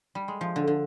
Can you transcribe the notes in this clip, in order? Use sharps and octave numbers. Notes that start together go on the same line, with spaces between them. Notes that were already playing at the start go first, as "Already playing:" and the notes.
G3
G#3
F3
D3
D3